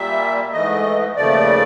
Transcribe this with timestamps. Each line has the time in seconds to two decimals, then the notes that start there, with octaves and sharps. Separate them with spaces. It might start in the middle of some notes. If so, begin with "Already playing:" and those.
Already playing: A#2 G3 A#3 E5
0.52 G#2 E3 A3 D#5
1.16 D#2 C#3 F3 A3 D5